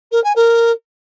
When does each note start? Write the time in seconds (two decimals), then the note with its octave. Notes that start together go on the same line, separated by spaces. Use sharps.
0.11 A#4
0.23 G#5
0.35 A#4